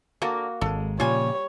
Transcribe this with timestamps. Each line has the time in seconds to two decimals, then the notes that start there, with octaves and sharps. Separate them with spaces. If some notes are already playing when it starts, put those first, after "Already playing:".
0.22 D3 A#3 F#4 A4 A#4
0.61 G#1 G#3 A4
1.00 A#2 C#3 F3 G3 F4 C#5 G#5